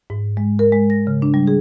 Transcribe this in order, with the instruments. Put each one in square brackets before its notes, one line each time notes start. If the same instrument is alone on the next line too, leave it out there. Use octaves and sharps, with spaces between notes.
[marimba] G#2
G#3
A#4
G#3
A#6
C#3
D4
G3
G#4